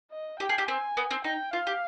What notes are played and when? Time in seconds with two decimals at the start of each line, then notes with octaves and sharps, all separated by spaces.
0.11 D#5
0.39 G4 G5
0.49 G#4
0.58 G4
0.68 C4 G#5
0.97 B3
1.11 C4
1.24 D#4 G5
1.53 F4 F5
1.67 G4